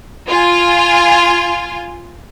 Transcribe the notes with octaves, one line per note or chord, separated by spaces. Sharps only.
F4 G#5